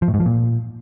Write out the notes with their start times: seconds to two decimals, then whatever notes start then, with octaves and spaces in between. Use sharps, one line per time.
0.02 F3
0.08 A2
0.14 G#2
0.20 F3
0.26 A#2